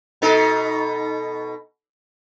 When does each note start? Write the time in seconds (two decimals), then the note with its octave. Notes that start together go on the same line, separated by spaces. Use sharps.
0.22 B2 D#4 A4